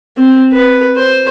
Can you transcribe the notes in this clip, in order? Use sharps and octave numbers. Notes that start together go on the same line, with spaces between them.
C4
B4
C5